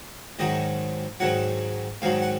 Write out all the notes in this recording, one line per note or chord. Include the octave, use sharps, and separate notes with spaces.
G#2 D#3 F#3 D#5
G#2 D#3 F#3 F#5
G#2 D#3 F#3 F5
F#5